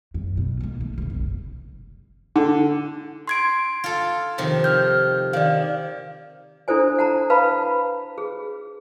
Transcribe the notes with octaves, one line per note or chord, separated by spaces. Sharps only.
F#2
B2
B1 A#3
A3
B1 D3
F#1 C3
D3
C6 G#6 D7
F4 A4
F2 C3 D#3
F6 G6
D#3 D5 F5
D4 E4 A4 C5 G#5
F#5 A5 A#5
B4 F5 A5 B5
G#4